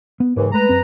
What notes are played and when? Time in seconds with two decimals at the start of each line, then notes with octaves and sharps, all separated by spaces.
0.20 B3
0.36 D#2 G#2 C#3 E3
0.52 G#3 A3 B4 A#5
0.69 F#2 C4